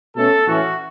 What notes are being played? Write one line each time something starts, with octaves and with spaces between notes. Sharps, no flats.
B2 A3 C#4 A4
A2 E3 A3 C#4 F#4